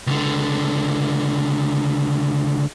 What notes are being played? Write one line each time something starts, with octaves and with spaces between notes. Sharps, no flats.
C#2 D3